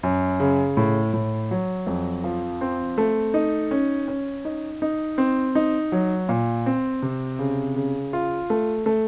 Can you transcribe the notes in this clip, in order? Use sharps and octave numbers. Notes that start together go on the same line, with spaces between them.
F#2
C#3
A2
A2
F#3
F2
F3
C4
A3
D#4
C#4
C#4
D#4
D#4
C4
D#4
F#3
A#2
C4
C3
C#3
C#3
F4
A3
A3